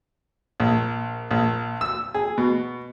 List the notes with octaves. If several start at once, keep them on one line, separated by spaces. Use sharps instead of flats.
A#1
A#1
E6
G#4
B2